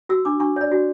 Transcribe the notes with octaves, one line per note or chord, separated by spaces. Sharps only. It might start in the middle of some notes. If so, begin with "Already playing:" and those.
F#4 E6
D4 D6
D4 C#6
C#5 D5
F#4